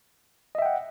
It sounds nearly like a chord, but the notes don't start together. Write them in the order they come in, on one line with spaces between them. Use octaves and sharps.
D#5 E5 G5 F#5